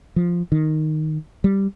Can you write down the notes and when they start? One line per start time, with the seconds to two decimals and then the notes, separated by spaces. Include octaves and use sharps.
0.16 F3
0.52 D#3
1.44 G3